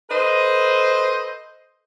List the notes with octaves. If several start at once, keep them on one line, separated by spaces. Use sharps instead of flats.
A4 B4 C5 D#5